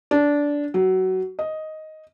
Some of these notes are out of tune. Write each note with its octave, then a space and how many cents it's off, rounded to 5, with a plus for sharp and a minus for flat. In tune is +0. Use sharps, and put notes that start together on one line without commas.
D4 -15
F#3 +20
D#5 +5